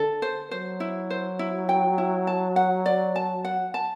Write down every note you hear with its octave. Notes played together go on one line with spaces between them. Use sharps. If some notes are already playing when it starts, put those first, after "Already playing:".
Already playing: D3 A4
C5
F#3 C5
E4
C5
E4
G5
E4
A5
F#5
D5
A5
F#5
A5